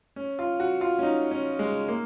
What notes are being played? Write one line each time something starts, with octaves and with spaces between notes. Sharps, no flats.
C#4
F4
F#4
F4
C#4
D#4
C#4
G#3
A#3